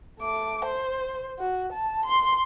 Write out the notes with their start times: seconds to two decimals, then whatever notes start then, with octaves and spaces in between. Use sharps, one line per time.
0.20 A3 D6
0.65 C5
1.39 F#4
1.72 A5
2.05 C6